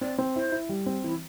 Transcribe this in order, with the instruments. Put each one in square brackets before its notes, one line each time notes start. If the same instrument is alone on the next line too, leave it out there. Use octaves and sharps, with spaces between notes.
[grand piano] C4 [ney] D5
[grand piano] C4
[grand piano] E4 [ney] C5
[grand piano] E4
G3
C4
[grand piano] E3 [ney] E4